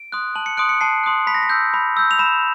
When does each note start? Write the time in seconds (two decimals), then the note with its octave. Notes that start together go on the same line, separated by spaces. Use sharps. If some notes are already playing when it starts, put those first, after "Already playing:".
Already playing: D7
0.12 C6 D#6 F#6
0.36 A5 F#7
0.46 C#7
0.57 C6 D#6 F#6 D7
0.69 C#7
0.81 A5 C7
1.04 C6 D#6 F#6
1.27 B5 B6
1.34 A#6
1.43 B6
1.50 E6 G6
1.74 B5
1.97 E6 G6
2.11 F7
2.19 B5 E7